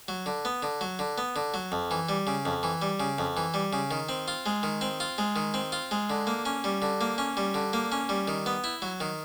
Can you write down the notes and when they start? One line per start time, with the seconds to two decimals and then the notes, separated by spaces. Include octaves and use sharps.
0.08 F#3
0.26 D3
0.45 B3
0.63 D3
0.81 F#3
0.99 D3
1.18 B3
1.36 D3
1.54 F#3
1.72 F2
1.91 E3
2.09 G3
2.27 C#3
2.46 F2
2.63 E3
2.82 G3
3.00 C#3
3.18 F2
3.37 E3
3.54 G3
3.73 C#3
3.91 D#3
4.09 C4
4.28 F4
4.46 G#3
4.63 D#3
4.81 C4
5.00 F4
5.18 G#3
5.36 D#3
5.54 C4
5.72 F4
5.91 G#3
6.10 D3
6.27 A#3
6.46 C#4
6.64 G3
6.82 D3
7.01 A#3
7.18 C#4
7.37 G3
7.54 D3
7.73 A#3
7.92 C#4
8.09 G3
8.28 D#3
8.46 B3
8.64 E4
8.82 F#3
9.00 D#3